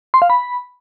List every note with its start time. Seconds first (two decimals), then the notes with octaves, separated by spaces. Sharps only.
0.14 C6
0.22 F5
0.30 B5